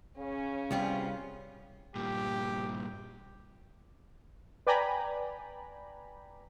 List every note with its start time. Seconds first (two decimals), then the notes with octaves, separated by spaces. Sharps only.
0.18 C#3 C#4
0.71 C2 G3 B3 C4 F4
1.96 G2 A#2 G4
4.67 B4 D5 G5 G#5 A#5 B5